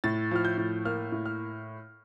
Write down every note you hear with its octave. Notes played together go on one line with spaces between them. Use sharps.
A2 A6
F3 F6
G6
A2
A#3 F6
A2
F6